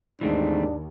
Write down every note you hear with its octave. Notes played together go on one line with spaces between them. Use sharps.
D#2 G#2 E3 A3 C4 D4